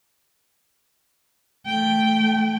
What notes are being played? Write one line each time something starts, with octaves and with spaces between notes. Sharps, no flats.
A3 G5